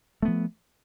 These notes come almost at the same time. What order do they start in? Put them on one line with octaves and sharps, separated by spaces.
A3 B3 F3